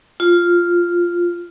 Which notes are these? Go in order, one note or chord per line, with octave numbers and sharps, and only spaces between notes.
F4